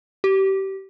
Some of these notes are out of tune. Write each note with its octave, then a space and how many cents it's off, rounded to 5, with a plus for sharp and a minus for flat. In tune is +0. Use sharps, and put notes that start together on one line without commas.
G4 -25